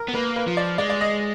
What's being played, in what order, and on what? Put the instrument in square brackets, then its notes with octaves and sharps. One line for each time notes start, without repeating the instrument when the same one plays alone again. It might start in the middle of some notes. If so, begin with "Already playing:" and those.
Already playing: [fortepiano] A#4
[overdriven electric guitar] B3
[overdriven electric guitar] A#3 [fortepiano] B4
[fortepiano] B4
[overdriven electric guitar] F3
[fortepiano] D5
[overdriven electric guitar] G#3 [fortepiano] D5
[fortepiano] D5
D#5